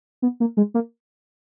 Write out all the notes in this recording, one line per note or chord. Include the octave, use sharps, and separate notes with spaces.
B3
A#3
G#3
A#3